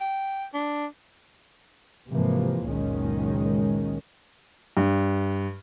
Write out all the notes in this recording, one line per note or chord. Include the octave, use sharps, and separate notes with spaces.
G5
D4
G#2 C3 E3 F3 A#3
F#1 C#2 A#2 D#3 G#3 C#4
G2